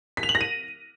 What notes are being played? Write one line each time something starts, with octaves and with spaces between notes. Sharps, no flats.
B6
F7
F#7
A#6
D#7